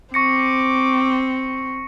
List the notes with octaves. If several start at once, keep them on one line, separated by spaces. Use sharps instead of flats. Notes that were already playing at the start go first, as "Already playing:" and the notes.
C4 C#6 D6 A#6 C#7